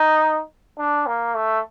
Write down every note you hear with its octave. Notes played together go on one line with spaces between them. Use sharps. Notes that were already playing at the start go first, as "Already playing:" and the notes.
Already playing: D#4
D4
A#3
A3